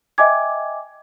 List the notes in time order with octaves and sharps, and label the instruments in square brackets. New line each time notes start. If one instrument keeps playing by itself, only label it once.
[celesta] D#5 E5 G5 G#5 D6 G#6